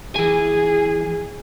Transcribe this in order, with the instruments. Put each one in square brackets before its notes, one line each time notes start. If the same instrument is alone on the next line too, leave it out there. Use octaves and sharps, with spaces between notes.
[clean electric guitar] E3 G#5 [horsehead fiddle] G#4